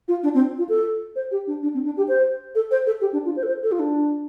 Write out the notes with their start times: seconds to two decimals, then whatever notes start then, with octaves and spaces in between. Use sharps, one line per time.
0.08 F4
0.23 D4
0.34 C4
0.58 F4
0.69 A4
1.16 C5
1.31 G4
1.47 D4
1.63 D4
1.74 C4
1.85 D4
1.97 G4
2.08 C5
2.55 A4
2.71 C5
2.86 A4
3.01 G4
3.13 D4
3.25 F4
3.36 C5
3.43 A4
3.48 C5
3.63 A4
3.72 F4
3.79 D4